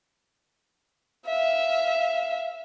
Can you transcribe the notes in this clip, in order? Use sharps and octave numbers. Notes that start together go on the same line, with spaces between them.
E5 F5